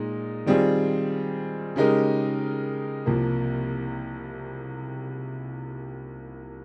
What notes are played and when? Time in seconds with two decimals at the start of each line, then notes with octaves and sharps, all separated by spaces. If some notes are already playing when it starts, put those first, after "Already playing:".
Already playing: A#2 G#3 D#4
0.46 D#3 G3 C4 F4 G#4
1.76 C#3 G#3 D#4 G4 A#4
3.06 C2 C3 F3 A#3